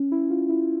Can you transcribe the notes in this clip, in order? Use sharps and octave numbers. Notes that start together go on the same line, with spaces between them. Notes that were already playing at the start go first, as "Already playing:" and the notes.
Already playing: C#4
E4
F4
E4